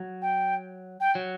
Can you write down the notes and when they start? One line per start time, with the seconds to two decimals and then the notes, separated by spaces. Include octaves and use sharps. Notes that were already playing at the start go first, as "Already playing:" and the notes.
Already playing: F#3
0.22 G5
1.00 G5
1.15 F#3